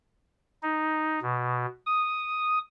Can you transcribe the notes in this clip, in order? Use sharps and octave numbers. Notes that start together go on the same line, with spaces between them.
D#4
B2
D#6